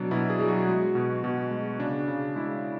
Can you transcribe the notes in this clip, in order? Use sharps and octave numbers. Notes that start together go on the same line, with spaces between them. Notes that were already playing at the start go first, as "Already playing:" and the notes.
Already playing: B2 F#3 D4
B2 E4
G#4
F#3
F#4
G#3
B2
B2
G#3
C#3 D4
C#3
G#3 E4